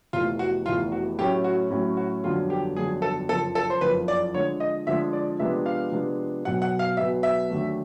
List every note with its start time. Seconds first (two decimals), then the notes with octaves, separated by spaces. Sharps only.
0.13 F1 E2 C3 E3 A3 F4
0.39 F#4
0.66 F1 E2 C3 E3 A3 F4
0.92 F#4
1.18 A2 F#3 A3 C#4 G4
1.44 F#4
1.71 A2 F#3 A3 C#4
1.97 F#4
2.24 G1 F2 D3 F#3 F4
2.50 G4
2.76 G1 F2 D3 F#3 G#4
3.02 A4
3.28 F#1 F2 C#3 F3 A#3 A4
3.55 A4
3.70 C5
3.81 F#1 F2 C#3 F3 A#3 B4
4.08 D5
4.34 D3 F3 G#3 C#5
4.60 D#5
4.87 D3 F3 G#3 E5
5.13 D5
5.39 C3 F3 G#3 B3 D4 E5
5.66 F5
5.92 C3 F3 G#3 B3 D4
6.45 B1 B2 F#3 B3 F#5
6.62 F#5
6.79 F5
6.97 B1 B2 F#3 B3 E5
7.23 E5
7.50 D#2 D3 F#3 A3